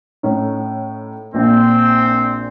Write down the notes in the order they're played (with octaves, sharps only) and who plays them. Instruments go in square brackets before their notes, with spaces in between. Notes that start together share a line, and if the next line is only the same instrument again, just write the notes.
[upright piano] A2 C#4 D#4
[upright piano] A#1 A#2 [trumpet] C4